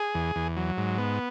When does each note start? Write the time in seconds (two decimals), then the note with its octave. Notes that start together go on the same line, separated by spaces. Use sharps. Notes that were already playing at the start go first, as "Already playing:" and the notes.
Already playing: G#4
0.14 E2
0.36 E2
0.57 F#3
0.77 G#2
0.98 B3